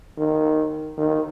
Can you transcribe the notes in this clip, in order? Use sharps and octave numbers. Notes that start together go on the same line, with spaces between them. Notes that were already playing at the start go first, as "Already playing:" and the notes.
D#3
D#3